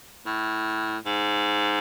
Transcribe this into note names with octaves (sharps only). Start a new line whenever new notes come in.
A2
G#2